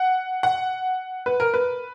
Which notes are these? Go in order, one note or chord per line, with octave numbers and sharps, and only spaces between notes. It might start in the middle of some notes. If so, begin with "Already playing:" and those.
Already playing: F#5
F#5
B4
A#4
B4